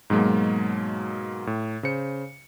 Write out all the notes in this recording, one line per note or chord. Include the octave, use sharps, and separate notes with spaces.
G#2 B2 F#3 G#3 A#3
A2
C#3 C5 C#7